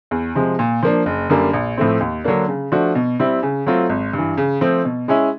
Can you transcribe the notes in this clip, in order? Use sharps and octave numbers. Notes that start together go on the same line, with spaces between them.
E2
C3 F3 G#3
A#2
F3 A#3 D4
F#1
F#2 D3 G3 A#3
A#1
A2 F3 A3 C4
D#2
D3 F#3 A#3 D4
C#3
F3 A3 D4 F#4
B2
G3 C4 E4
C#3
F#3 A3 C4 F4
G#1
G2 E3
C#3
F3 A3 C4
B2
G#3 C#4 E4